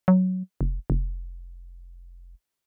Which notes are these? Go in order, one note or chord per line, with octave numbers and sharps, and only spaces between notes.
F#3
F1
F1